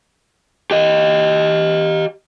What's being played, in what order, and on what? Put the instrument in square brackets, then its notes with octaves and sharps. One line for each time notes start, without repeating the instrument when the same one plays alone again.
[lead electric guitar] G4 D#5